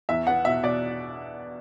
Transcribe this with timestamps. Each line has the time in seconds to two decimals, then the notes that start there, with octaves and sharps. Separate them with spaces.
0.09 E2 E5
0.27 B3 F#5
0.45 B2 E5
0.63 B2 D5